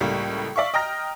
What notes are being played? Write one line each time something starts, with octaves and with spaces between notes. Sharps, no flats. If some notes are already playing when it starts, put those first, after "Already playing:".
C#2 A2 G3 A#3
D5 E5 F5 C#6
D#5 G5 A#5 F6 A#6